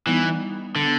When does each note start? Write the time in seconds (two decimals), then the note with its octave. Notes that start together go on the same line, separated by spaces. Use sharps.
0.07 E3 G3 B3 D#4
0.76 D3